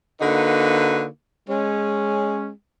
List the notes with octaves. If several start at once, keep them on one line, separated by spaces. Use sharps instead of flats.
D3 A#3 D#4 F#4 B4
G#3 C#4